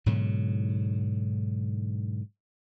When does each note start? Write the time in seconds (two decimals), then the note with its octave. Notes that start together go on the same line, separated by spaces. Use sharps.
0.06 G#2 B2 D3 F#3